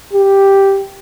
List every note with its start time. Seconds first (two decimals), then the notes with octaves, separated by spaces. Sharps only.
0.13 G4